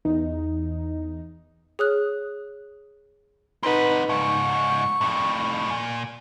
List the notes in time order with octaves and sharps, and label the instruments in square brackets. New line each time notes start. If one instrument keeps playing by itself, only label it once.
[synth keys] E2 D#4
[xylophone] G#4 C#5 D#6 F6 F#6
[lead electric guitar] C4 F#5 [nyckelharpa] D#4 B4
[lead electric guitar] C#2 G#2 [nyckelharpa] C#6
[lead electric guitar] F2 A2
A#2